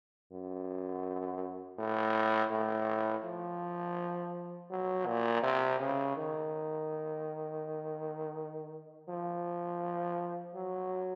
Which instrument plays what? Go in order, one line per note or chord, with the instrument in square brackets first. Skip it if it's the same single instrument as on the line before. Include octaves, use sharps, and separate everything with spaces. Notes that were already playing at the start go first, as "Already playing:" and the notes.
[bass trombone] F#2
A2
A2
F3
F#3
A#2
C3
C#3
D#3
F3
F#3